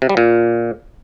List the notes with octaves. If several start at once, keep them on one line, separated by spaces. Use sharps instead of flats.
C3
G3
A#2